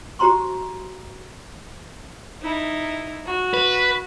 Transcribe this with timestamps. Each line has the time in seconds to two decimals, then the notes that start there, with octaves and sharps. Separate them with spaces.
0.19 F#4 G4 C5 A#5 C6 C#6
2.42 D#4 E4
3.24 F#4
3.54 B4